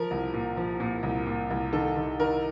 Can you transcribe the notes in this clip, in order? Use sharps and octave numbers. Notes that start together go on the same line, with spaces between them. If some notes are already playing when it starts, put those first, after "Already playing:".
Already playing: F3 A#4
C2
A#2
F3
A#2
C2
A#2
C2
D#3 A4
D#3
D#3 A#4